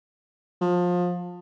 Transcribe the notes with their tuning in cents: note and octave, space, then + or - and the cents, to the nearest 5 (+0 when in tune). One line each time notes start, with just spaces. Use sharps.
F3 +25